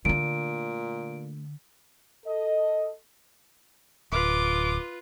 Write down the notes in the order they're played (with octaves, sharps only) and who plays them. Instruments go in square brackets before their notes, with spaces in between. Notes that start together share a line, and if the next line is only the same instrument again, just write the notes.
[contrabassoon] A#2 [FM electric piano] D3 [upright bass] A3 D4 [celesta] D7
[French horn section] A4 D#5
[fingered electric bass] D1 [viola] F4 B4 [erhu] D6